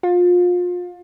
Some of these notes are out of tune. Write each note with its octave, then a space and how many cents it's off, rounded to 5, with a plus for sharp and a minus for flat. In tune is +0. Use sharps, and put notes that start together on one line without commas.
F4 +30